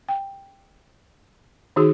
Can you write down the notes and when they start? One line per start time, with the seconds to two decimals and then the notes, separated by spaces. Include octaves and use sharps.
0.09 G5
1.76 D#3 D#4 F#4 G#4